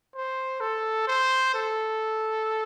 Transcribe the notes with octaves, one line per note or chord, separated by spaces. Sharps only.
C5
A4
C5
A4